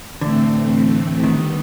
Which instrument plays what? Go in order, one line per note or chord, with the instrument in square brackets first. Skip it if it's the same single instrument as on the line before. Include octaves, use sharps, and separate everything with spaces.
[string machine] A2 E3 A3 C4 [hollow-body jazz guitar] D3
[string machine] D3 G3 B3 [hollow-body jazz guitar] D#3